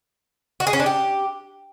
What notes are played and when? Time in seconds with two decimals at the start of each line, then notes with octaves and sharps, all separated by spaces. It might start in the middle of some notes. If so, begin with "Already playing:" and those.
0.60 F#4
0.67 G#4
0.73 C#4
0.80 D4
0.86 G4